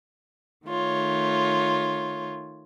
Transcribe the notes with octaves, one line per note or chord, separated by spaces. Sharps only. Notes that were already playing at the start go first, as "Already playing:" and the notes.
D#3 A3 F4 C#5